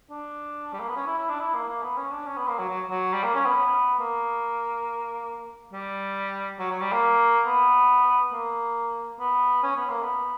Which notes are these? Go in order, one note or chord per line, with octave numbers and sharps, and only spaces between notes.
D4
G3
A#3
B3
C#4
E4
E4
D4
E4
A#3
A#3
B3
C#4
D4
C#4
B3
A#3
F#3
F#3
F#3
G3
A#3
C#4
B3
B3
A#3
G3
F#3
F#3
G3
A#3
B3
A#3
B3
C#4
B3
A#3
B3